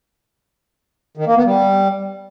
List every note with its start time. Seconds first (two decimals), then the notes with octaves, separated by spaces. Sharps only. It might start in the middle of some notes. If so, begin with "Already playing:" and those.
1.17 D#3
1.27 A#3
1.36 B3
1.45 G3